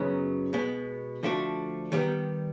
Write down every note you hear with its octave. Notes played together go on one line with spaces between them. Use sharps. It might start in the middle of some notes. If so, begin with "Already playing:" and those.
Already playing: F#2 C#3 F#3 B3 D#4
B2 G#3 B3
D3 F3 A3 D4 F#4
D#3 G3 B3